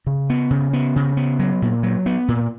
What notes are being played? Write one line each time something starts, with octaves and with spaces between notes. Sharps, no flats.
C#3
B3
C#3
B3
C#3
B3
F#3
A#2
F#3
B3
A#2